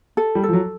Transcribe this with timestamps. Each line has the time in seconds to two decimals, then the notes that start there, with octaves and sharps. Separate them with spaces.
0.17 A4
0.35 G3
0.44 F3 A4
0.53 F#3